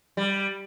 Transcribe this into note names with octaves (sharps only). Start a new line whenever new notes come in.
G3